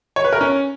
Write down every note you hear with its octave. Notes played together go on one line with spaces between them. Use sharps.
C#5
B4
A#4
C#4